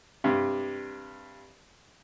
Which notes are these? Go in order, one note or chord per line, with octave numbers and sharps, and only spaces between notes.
G2 C3